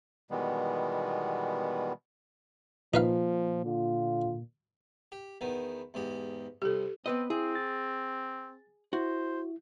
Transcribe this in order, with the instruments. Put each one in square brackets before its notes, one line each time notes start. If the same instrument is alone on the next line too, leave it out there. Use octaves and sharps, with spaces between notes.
[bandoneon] B2 D#3 E3 G3 G#3 B3
[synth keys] A#2 [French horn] F3 [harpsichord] D#4 B4 F5
[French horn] D3 [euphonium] F4
[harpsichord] G4
E2 D#3 B3
E2 G#2 G4
[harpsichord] C2 [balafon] G4 A4
[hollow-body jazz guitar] B3 B4 D#5 [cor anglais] C4
[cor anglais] C4 [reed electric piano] E4 [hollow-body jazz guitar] G#4
[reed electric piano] A6
[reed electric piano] E4 [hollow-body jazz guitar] F#4 [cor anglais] C5